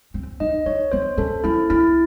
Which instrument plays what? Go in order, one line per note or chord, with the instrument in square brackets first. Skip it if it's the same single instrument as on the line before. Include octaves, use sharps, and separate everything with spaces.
[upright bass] C4
[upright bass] D#4 [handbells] D#5
[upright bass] D#4 [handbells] C#5
[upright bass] C4 [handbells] C5
[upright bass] C#4 [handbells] A4
[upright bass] C#4 [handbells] E4
[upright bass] C#4 [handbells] E4